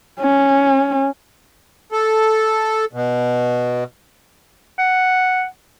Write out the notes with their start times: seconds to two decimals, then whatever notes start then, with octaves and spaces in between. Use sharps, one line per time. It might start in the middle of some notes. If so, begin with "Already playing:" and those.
0.20 C#4
1.92 A4
2.93 B2
4.78 F#5